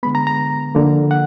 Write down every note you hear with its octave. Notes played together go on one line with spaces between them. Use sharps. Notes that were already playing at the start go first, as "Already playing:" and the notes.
D3 G#3 B3 B5
A#5
A#5
D3 F3 A#3
F#5